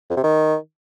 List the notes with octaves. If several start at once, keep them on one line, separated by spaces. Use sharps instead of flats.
F2
C3
D#3